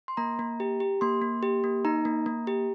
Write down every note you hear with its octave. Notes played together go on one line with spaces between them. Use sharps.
C6
A#3 A#5
A#3
G4
G4
A#3 C6
A#3
G4
A#3
D#4 A#5
A#3
A#3
G4